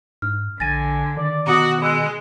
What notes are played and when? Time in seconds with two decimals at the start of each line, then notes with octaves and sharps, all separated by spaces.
0.22 G#2 F6
0.60 A#1 D3 G#5 A6 A#6 D#7
1.17 D#3 D5
1.47 B2 F#4 A#5 D6 D#6
1.82 G#3 B5 E6 F#6